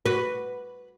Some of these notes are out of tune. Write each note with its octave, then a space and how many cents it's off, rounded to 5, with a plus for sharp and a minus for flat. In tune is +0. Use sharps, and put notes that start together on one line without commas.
F#4 +0 B4 +0